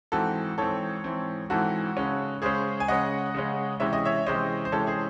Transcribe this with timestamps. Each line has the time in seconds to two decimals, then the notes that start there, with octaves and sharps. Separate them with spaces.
0.12 G#2 E3 C4 F#4 A4
0.58 G#2 E3 C4 A4 C#5
1.04 G#2 E3 C4
1.50 G#2 E3 C4 F#4 A4
1.97 C#3 G#3 C#4
2.42 C#3 G#3 C#4 G#4 C5
2.80 G#5
2.88 C#3 G#3 C#4 D#5 F#5
3.34 C#3 G#3 C#4
3.80 C3 E3 G#3 C#4 E5
3.93 D#5
4.05 C#5 E5
4.26 C3 E3 G#3 C#4 C5 D#5
4.65 C5
4.72 C3 E3 G#3 C#4 A4 C#5
4.87 G#4 C5